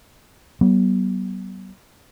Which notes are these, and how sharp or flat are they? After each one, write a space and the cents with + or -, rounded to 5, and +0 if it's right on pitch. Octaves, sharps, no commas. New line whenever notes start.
F#3 +45 B3 -30